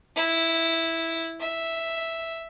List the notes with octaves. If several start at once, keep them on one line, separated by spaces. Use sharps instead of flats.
E4
E5